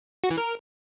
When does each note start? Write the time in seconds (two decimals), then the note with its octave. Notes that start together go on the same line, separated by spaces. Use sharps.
0.24 F#4
0.31 E3
0.37 A#4